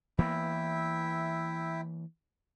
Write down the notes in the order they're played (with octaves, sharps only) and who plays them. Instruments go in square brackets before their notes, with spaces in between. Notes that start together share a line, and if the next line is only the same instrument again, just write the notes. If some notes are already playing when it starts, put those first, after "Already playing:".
[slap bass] E3 A#3 B3 [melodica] E4 E5 G5